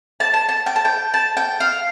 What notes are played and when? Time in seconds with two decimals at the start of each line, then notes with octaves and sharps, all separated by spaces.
0.20 A5
0.34 A5
0.49 A5
0.66 G5
0.76 A5
0.85 G5
1.14 A5
1.37 G5
1.60 F5